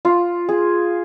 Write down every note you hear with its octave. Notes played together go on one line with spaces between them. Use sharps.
F4
G#4